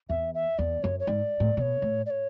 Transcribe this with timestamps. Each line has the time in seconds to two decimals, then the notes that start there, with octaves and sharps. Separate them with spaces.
0.09 E2 E5
0.35 E5
0.58 E2 D5
0.83 F#2 C#5
1.00 C#5
1.07 G#2 D5
1.40 A2
1.57 B2 D5
1.61 C#5
1.82 A2
2.06 D5
2.10 C#5